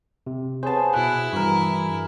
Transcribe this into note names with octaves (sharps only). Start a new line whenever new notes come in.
C3
B3 G#4 C5 C#5 A5
B2 E4 F#6
G2 E3 F#4 A#4